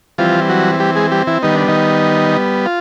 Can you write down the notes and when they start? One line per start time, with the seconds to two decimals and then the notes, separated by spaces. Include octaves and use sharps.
0.18 E3 F3 G3 C4 F4
0.49 F#3 F#4
0.80 G3 G4
0.95 G#3 G#4
1.12 G3 G4
1.27 E3 E4
1.42 D#3 G3 B3 D#4
1.55 D4
1.68 D#3 D#4
2.66 F4